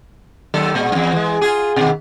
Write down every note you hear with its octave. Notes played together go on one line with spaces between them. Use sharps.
D#2 F#3 A4
A#2 G#3
E2 G2
E3 G#3
F4 G4 G#4
B2 D#3